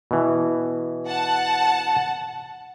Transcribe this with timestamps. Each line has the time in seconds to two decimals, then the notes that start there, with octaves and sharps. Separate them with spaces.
0.11 B2 E3
1.07 F#5 A5